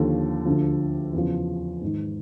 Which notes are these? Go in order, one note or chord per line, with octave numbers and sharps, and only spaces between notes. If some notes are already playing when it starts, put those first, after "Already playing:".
Already playing: D#2 D3 F3 G4 A4
D2 D3 F3
E2 C#3 F3
G#2 D#3